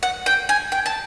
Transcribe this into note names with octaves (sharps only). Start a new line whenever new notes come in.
F#5
G5
G#5
G5
A5